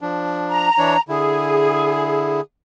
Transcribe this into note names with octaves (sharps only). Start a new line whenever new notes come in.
F3 D4
A#5
E3 D4 C#5
D3 E4 G#4